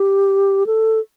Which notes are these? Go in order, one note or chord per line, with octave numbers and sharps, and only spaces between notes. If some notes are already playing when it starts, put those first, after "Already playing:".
Already playing: G4
A4